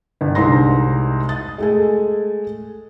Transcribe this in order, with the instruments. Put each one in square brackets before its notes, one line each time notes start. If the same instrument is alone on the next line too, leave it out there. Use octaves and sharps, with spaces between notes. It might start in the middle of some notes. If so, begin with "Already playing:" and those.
[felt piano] G1
C2 G#2 C6 A#6
D#6 A6
G#3 A3 G#5